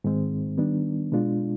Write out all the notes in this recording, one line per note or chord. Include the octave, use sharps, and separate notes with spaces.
G#2 D#3 G#3 C4
D#3 G3 B3 D4
B2 G#3 D4 F4